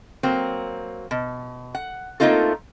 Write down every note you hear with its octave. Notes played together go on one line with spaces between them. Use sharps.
F#3 A#3 C4
B2
F#5
A3 A#3 C4 D#4 F4 A4